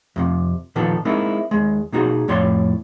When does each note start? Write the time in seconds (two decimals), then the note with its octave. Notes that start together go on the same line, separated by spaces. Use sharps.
0.16 F2 A2 C3
0.76 A#2 D#3 F3 B3 A4
1.05 G#3 A#3 C4 D#4 E4
1.51 D#2 G#3
1.92 B2 A#3 D#4 F#4 G#4
2.28 F2 A2 C#5 D5 C6